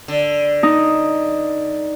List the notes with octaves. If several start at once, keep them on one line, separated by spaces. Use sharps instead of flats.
D3
D#4